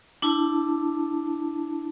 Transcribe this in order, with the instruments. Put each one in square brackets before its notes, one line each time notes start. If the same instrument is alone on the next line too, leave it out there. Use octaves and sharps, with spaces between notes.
[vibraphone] D4 E4 A5